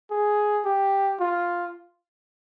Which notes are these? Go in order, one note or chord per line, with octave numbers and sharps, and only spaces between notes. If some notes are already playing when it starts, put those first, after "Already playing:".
G#4
G4
F4